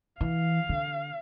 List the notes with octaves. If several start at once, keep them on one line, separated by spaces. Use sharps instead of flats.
E3 F5
D3